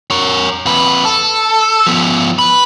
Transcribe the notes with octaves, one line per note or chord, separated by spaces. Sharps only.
A#4 C#5
F2 B4
A4
F3 B3
B4 B5